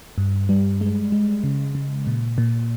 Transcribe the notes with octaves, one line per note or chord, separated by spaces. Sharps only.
G2
G3
G#3
G#3
C#3
C#3
A#2
A#2